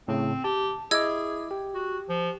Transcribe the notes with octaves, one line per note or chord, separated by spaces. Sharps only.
A2 C#3 C4
G4 A5
E4 G#4 D#5 D6 E6 G#6
G4
F#4
F3